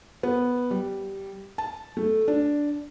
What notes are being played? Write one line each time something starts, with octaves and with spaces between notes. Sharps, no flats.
B3
G3
A5
A3
D4